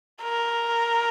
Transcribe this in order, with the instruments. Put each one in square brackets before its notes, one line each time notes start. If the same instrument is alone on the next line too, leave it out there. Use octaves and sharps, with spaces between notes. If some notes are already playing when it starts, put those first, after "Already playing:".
[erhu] A#4